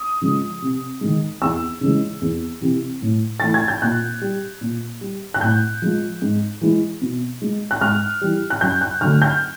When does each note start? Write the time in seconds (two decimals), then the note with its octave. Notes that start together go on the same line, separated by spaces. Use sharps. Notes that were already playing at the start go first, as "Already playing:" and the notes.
Already playing: D#6
0.21 C#3 F3 G#3
0.62 C3
1.01 D#3 G#3
1.42 E2 E6
1.81 C#3 E3 G#3
2.22 E2
2.61 C3 E3
3.02 A2
3.40 E3 A3 A6
3.54 G#6
3.68 G6
3.82 A#2 F#6
4.21 G3
4.61 A#2
5.01 G3
5.34 F#6
5.41 A2 G6
5.82 F3 G#3
6.22 G#2
6.61 E3 G#3
7.01 B2
7.42 G#3
7.71 F#6
7.81 G#2 F6
8.21 E3 G3
8.50 F#6
8.61 F#2 G6
8.81 F#6
9.01 D3 F#3 A3 F6
9.22 G6